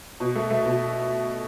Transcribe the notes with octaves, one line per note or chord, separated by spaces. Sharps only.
B2
A3
A3
B2